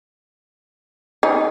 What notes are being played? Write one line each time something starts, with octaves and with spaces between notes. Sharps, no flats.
D#4